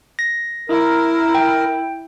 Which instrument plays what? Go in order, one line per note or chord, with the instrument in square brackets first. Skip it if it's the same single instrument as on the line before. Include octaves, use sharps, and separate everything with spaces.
[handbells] A#6
[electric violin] E4 [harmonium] A#4
[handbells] G5